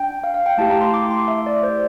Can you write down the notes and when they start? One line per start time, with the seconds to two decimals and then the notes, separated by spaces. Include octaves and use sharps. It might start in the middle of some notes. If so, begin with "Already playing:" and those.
Already playing: D4 G5
0.24 F5
0.34 F5
0.46 G5
0.58 A3 E4 G4 A5
0.70 A#5
0.81 C6
0.94 D6
1.11 C6
1.28 E5
1.46 D5
1.63 C5